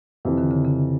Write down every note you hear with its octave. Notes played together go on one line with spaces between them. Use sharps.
F2 C3 D#3 E3
D3
C#3
C#3